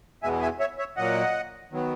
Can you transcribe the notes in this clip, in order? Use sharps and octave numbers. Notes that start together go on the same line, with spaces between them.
E2 B2 G#3 B3 E5 G#5
E5 G#5
C#5 E5
C#5 E5
A#2 F#3 A#3 D#5 F#5
D#3 F#3 B3